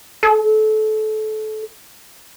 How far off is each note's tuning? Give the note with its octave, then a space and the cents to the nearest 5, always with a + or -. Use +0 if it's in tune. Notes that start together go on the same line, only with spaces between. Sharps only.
A4 -25